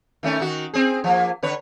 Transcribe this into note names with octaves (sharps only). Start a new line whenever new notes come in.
D#3 A3 C#4
D#3 F#4
C4 G#4
F3 A#3
D3 B4 C#5